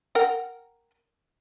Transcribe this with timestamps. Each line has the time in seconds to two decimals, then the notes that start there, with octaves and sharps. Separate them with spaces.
0.15 A#4 F#5 G5